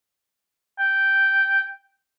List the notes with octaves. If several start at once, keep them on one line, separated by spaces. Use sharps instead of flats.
G5